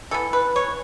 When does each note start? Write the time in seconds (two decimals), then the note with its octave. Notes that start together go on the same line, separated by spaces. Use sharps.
0.11 E3 B3 A4
0.33 B4
0.56 C#5